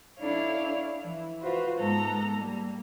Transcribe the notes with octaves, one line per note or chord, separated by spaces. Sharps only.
D4 E4 A4 C#5 F5
E3 E4
F4 F#4 B4 C5
G#2 G#3 B3 A4 A#5
G3 A#3